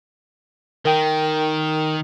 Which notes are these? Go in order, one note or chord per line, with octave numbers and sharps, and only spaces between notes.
D#3 A#4 G5